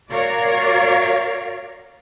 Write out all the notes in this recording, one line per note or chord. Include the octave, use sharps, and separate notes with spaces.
F#4 A#4 C#5 D5 F5